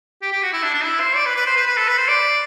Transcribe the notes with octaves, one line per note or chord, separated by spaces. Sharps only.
G4
G4
F#4
E4
D4
D4
E4
C5
D5
B4
B4
C5
B4
B4
A4
B4
C5
D5